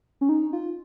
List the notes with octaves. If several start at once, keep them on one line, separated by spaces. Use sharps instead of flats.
C#4
D#4
F4